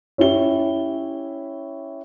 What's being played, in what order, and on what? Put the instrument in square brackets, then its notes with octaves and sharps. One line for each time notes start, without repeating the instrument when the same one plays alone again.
[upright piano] C#4 E4 G4 G7